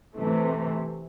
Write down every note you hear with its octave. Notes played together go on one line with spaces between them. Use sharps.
C3 E3 A3